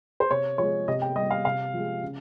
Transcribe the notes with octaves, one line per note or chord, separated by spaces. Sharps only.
C5
C3 C#5
F3 G#3 C#5
C3 D#5
G5
G3 D#5
F5
C3 F5
F3 G#3
C#3